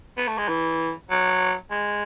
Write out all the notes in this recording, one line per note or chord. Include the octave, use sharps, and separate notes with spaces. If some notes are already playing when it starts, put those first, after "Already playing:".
B3
A3
G#3
E3
F#3
G#3